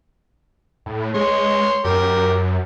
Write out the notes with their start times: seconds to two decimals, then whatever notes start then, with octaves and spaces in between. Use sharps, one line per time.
0.86 A2
1.14 G#3 C#5 C6
1.85 F#2 G4 A#4